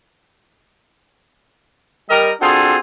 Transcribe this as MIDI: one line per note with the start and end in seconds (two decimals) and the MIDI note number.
2.10 2.31 55
2.10 2.31 70
2.10 2.31 75
2.41 2.76 60
2.41 2.76 62
2.41 2.76 65
2.41 2.76 66
2.41 2.76 68
2.41 2.76 69